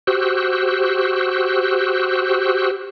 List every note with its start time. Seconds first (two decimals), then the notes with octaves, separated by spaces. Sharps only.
0.07 F#4 G4 C5 E6 F#6